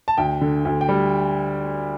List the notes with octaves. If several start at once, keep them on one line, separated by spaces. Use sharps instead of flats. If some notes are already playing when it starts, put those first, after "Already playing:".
A5
D2 G5
D3
D2
G5
G3